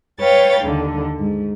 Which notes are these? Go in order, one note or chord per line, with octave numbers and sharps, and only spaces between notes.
B4 C#5 F5 G5 A6
D#2 D3
G#2